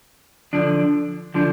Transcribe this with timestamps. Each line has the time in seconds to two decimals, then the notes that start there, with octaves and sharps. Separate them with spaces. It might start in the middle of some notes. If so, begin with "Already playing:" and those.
0.53 D3 F3 D4
1.34 D3 F3 D4